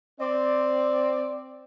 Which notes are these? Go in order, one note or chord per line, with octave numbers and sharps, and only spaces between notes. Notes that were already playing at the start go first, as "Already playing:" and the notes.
C4 D5